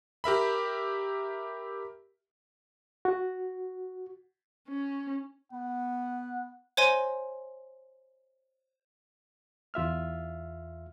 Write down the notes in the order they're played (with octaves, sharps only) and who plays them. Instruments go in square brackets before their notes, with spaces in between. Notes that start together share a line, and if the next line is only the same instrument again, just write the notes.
[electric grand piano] G4 A#4 E5 B5
[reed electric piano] F#4
[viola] C#4
[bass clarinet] B3 [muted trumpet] F#5
[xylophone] C5 C#5 D#5 G#5 C6 D#7
[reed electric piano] E2 F4 E5 F6